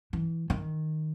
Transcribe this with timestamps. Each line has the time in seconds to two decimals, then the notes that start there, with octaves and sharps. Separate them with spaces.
0.13 E3
0.50 D#3